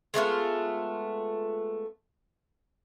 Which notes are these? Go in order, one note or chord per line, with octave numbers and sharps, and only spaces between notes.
G#3 A3 B3 F4